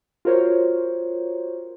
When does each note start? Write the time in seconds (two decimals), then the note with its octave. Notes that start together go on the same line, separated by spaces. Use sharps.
0.25 F4 F#4 A#4 C5 C#5